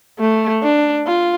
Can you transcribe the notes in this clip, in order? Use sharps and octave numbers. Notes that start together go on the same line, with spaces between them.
A3
D4
F4